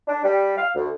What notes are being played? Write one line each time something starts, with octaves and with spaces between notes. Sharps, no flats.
D4
G3
F5
D2